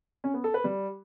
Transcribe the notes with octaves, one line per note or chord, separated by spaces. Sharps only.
C#4
B3
A4
B4
G3